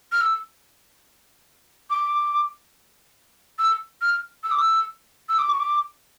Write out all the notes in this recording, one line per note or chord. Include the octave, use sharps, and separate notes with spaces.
F6
E6
D6
E6
F6
E6
D6
E6
E6
D6
C#6
D6